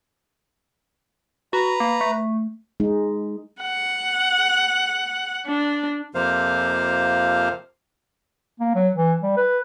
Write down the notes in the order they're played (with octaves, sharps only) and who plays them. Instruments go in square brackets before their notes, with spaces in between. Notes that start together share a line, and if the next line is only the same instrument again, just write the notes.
[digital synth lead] F#4 [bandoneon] B4 A#5
[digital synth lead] A#3
A3
[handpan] G#3 D#4
[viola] F#5
D4
[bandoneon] F2 C3 F3 A#3 C5 F5
[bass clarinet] A#3
F#3
E3
G3
B4